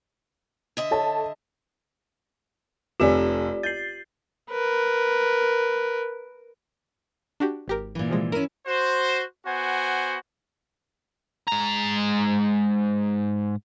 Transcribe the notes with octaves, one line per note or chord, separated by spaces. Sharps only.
D3 D#5 E5
A4 C#5 A5
F1 F2 F4 G4 D5 E7
G6 A6 C7
A#4 B4
D4 F#4 G4
G#1 G4 A#4
A#2 E3
C3 F3 G#3
C#4 E4 A#4 D#7
F#4 C5
B3 F#4 C5 F#5 G#5
G#2 A#5